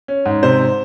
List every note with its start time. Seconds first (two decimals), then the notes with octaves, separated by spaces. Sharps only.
0.08 C#4
0.25 G#2
0.43 C3 C5